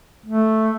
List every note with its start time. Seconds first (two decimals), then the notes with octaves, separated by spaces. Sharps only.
0.26 A3